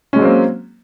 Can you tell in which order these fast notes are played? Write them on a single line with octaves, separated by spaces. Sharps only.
C#4 G#3 F#3 C4 A#3